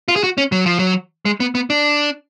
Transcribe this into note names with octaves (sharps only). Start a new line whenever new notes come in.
F4
G#4
F#4
C#4
F#3
F3
F#3
G#3
B3
B3
D4